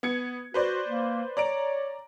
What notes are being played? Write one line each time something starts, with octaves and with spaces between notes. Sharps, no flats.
B3 G#6 C#7
F#4 B4 C5 D5
A#3
C#5 D5 A#5 D7